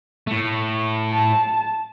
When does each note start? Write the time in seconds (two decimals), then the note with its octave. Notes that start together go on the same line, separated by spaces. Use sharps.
0.27 A2 A3
1.12 A5